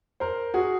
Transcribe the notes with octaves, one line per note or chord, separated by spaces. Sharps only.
A#4 C5
F#4 G#4